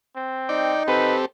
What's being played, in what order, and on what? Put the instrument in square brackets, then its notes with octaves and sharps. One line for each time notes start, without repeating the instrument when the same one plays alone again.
[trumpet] C4
[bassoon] D#4 [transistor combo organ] D5 G5
[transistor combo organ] C4 G4 A4 [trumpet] B4